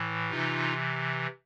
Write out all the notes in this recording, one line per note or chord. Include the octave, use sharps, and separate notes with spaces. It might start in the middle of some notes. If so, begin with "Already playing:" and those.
Already playing: A2 E3
C3 E3 D#4 F4